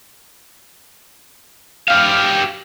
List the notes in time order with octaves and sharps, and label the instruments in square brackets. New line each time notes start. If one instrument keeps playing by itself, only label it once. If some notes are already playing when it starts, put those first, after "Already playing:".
[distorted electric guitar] G4 F5